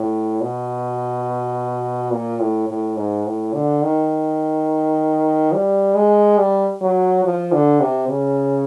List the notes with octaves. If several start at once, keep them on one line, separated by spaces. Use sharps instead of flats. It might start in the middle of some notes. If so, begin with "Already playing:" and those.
Already playing: A2
B2
A#2
A2
A2
G#2
A2
D3
D#3
G3
G#3
G3
F#3
F3
D3
C3
C#3